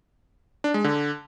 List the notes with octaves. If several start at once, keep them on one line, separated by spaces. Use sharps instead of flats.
D4
G#3
D3